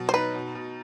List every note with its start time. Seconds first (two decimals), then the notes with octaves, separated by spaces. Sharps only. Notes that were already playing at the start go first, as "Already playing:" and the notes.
Already playing: B2 F#3
0.09 C5
0.13 D#4 B4
0.35 B2
0.55 B2